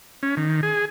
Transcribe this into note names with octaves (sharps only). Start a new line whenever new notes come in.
C#4
D#3
G#4